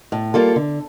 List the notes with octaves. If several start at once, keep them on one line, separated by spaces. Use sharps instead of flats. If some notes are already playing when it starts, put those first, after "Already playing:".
A2
G3 A#3 F4 A4
D3